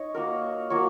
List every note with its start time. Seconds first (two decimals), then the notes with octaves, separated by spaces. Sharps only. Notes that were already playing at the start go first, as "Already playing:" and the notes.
Already playing: D#4 C#5
0.14 A#3 F#4 A#4
0.70 F#3 A#3 F#4 C#5